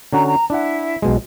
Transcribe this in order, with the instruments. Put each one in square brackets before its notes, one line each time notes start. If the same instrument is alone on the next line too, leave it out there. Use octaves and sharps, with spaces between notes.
[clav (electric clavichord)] D3 C#4 F#4 [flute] A#5
[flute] A#5
[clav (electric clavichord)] D4 F#5 [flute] E4
[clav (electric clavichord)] B1 B2 G#3